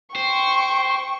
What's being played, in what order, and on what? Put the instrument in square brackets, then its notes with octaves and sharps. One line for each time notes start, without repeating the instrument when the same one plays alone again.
[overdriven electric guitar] C5 [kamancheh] G5 C#6